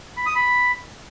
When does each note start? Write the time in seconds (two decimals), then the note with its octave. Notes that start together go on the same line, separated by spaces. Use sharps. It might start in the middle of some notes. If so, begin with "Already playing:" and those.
0.17 B5
0.26 D#6
0.35 B5